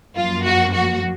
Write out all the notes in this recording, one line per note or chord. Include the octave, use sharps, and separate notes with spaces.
F#2 F3 A#3 F4
F#4
F#4